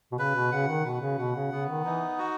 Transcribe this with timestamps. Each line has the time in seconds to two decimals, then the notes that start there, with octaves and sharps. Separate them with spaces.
0.12 B2
0.18 C#3 B4
0.35 B2
0.52 C#3 F#5
0.68 D#3
0.85 B2 B4
1.01 C#3
1.18 B2 F#5
1.36 C#3
1.52 C#3 B3
1.69 D#3
1.84 E3 D#4
2.19 F#4